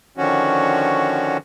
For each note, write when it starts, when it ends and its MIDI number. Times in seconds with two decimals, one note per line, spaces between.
0.18 1.37 50
0.18 1.37 51
0.18 1.37 53
0.18 1.37 61
0.18 1.37 66